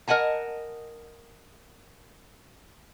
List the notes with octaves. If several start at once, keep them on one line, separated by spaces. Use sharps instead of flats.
A#4 D#5 F#5 G#5 A5